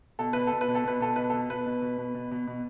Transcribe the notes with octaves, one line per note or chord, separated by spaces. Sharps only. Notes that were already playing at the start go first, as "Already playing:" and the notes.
B2 A4
B2 B4
B2 A4
B4
B2
A4
B2 B4
B2 A4
B2 B4
B2 A4
B2 B4
B2
B2
B2
B2
B2
B2